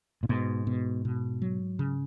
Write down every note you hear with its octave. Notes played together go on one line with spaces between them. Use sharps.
A#2
G#2 B2
B2
B2
F#3
C#3